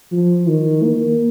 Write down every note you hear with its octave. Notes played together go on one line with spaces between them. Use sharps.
F3
D#3
A#3